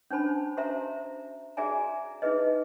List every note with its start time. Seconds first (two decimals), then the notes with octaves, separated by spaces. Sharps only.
0.10 C#4 D4 C5 A5 B5
0.57 F#4 C5 E5 A#5
1.57 F#4 G#4 D5 E5 G#5 A#5
2.22 D#4 E4 G#4 B4 D#5